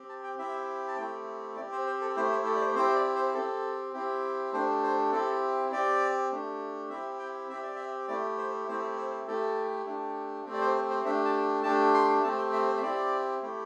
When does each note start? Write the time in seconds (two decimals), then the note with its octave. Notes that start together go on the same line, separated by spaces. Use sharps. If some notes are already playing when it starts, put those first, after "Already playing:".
Already playing: C4 G4
0.09 A5
0.24 G5
0.38 C4 E4 G4 E5
0.88 A5
0.97 A3 C4 E4 G4 G5
1.57 C4 G4 D5
1.72 C5
1.87 C5
2.01 A4
2.16 A3 E4 G4 C5
2.32 C5
2.46 A4
2.56 D5
2.61 C5
2.75 C4 E4 G4 C5
2.95 D5
3.15 C5
3.34 C4 G4 A4
3.93 C4 E4 G4
4.53 A3 D4 G4 C5
4.83 C5
5.12 C4 E4 G4 A4
5.71 C4 G4 D5
6.31 A3 D4 G4
6.90 C4 E4 G4 E5
7.19 G5
7.49 C4 G4 E5
7.63 D5
7.75 E5
8.08 A3 E4 G4 D5
8.38 C5
8.68 A3 C4 E4 G4 C5
8.98 C5
9.27 A3 E4 G4 A4
9.86 A3 D4 G4
10.45 A3 C4 G4
10.53 D5
10.61 C5
10.76 C5
10.90 C5
11.05 A3 D4 G4 E5
11.25 A5
11.63 A3 D4 G4 A5
11.94 C6
12.23 A3 C4 G4 A5
12.38 G5
12.53 E5
12.68 C5
12.78 E5
12.82 C4 E4 G4 D5
13.42 A3 E4 G4